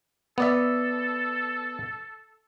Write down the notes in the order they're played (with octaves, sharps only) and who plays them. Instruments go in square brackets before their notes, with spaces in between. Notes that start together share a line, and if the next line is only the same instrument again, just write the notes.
[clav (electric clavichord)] B3 D5 E5 [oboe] A4